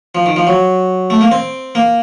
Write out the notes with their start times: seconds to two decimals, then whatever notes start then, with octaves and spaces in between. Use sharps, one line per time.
0.15 F3
0.26 D#3
0.36 F3
0.47 F#3
1.10 A3
1.21 A#3
1.31 C4
1.75 A#3